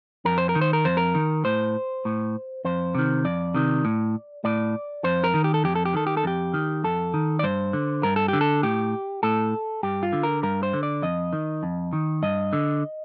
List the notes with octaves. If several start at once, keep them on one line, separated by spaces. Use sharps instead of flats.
F2 A#4
C5
A#4
D#3
C5
A#4
F2 C5
A#4
D#3
A2 C5
A2
F2 C5
C3 D#3
F2 D5
C3 D#3
A2
A2 D5
F2 C5
A#4
D#3
G4
A4
F2 G4
A4
G4
D#3 A4
G4
A4
F2 G4
D#3
F2 A4
D#3
D5
G2 C5
D3
G2 A#4
A4
D3 G4
A4
A2 G4
A2 A4
G2 G4
F4
D3
A#4
G2 A#4
C5
D3
D5
F2 D#5
D#3
F2
D#3
G2 D#5
D3